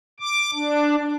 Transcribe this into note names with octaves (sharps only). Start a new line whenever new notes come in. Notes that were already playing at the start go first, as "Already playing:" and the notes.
D6
D4